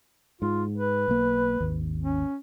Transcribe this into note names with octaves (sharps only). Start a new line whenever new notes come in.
G#2 F4
B4
B1 A#3
G#1 D#2
C#4